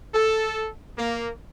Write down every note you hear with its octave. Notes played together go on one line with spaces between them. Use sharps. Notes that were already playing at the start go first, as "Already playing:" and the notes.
A4
A#3